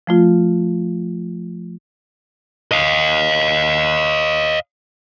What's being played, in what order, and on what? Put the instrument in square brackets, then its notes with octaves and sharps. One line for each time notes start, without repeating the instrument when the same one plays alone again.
[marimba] F3 A3 F4
[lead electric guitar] D#5 F5